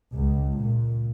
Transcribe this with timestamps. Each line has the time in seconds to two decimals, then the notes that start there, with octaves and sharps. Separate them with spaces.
0.14 C#2
0.58 A#2